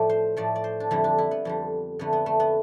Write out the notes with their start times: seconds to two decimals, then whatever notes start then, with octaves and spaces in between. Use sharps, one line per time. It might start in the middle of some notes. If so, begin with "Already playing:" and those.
Already playing: A2 F3 A3 D5
0.10 C5
0.37 A2 F3 A3 D5
0.56 D5
0.64 C5
0.80 D4
0.91 F2 D3 G3 E4
1.04 D4
1.18 E4
1.31 B3
1.45 F2 D3 G3
1.99 F2 D3 A3 B3
2.13 B3
2.26 A3
2.40 B3